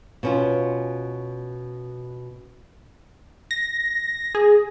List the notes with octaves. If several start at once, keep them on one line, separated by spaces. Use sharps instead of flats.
B2 C#4 F4
A#6
G#4